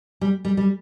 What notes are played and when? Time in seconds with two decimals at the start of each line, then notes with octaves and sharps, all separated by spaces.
0.21 G3
0.45 G3
0.57 G3